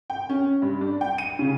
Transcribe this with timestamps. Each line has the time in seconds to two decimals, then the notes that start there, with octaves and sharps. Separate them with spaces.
0.10 G5
0.29 C#4
0.62 G2
0.81 D4
1.01 G5
1.18 D#7
1.39 C#3